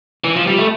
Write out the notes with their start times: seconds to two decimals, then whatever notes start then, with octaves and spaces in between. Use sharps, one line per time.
0.24 E3
0.36 F3
0.47 G3
0.59 A3